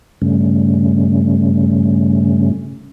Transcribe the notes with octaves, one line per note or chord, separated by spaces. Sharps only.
G2 C#3 G3 A3 C#4